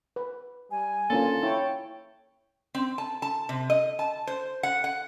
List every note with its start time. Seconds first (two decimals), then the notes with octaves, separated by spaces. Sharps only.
0.16 B4
0.71 G3 G#5
1.10 D3 A#3 C#4 F4 A4
1.43 E4 C#5 G5
2.75 C4
2.98 A5
3.22 A5
3.49 C3
3.70 D#5
3.99 A5
4.27 C5
4.63 F#5
4.84 F#5